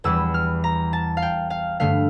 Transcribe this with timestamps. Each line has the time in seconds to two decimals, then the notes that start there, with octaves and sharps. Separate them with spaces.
0.04 E2 E3 G3 E6
0.34 F6
0.64 A#5
0.93 A5
1.17 F5
1.22 G5
1.50 F5
1.80 G2 D3 A3 F5